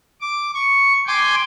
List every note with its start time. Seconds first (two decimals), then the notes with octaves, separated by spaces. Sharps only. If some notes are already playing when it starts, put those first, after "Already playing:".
0.21 D6
0.54 C#6
1.07 G5 G#5 C6 D6